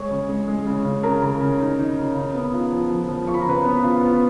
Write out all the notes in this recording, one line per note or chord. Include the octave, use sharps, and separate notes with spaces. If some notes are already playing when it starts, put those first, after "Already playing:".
Already playing: G#3 C#5 C#6
C#3
G#3
G#3
C#3
C#3
C#3 A#4 A#5
C#3
C#3
D#4
D#4
C#3
C#3
B3
F4
F3
F3
F3
F4 C#6
B5
A#5
C#3 B4 B5
B3
F4
B3